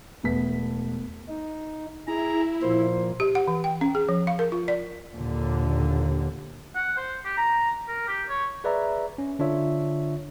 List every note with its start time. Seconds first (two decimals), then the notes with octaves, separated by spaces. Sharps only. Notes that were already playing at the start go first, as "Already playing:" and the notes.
0.23 E1 A3 B3 B6
1.29 D#4
2.08 E4 G#4 A#5
2.63 A#2 F3 A#3 C5
3.20 G4
3.35 F#5
3.48 E3
3.64 G5
3.81 C#4
3.95 G#4
4.09 F3
4.27 F5
4.39 A#4
4.52 F4
4.68 D5
5.14 D#2 A#2 D3
6.75 F#5
6.97 C5
7.25 G4
7.37 A#5
7.88 A#4
8.07 G4
8.29 C#5
8.64 G#4 B4 D5 E5 A#5
9.18 C#4
9.39 D3 D4 F4 C#5 E5